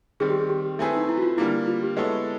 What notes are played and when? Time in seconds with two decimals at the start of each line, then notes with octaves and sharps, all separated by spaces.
0.20 D#3 G3 C4 G#4
0.30 G4
0.39 G#4
0.49 G4
0.79 A3 C4 E4 G#4 B4
0.97 D#4
1.09 E4
1.17 F#4
1.23 F4
1.37 D3 G3 A#3 E4
1.67 F4
1.83 G4
1.97 G#3 B3 E4 A4 C#5